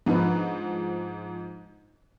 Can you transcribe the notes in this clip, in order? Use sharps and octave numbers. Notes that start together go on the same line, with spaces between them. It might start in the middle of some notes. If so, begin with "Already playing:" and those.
G#2 F3 D4 D#4 B4